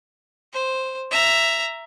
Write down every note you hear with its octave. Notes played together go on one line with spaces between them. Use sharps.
C5
E5 A#5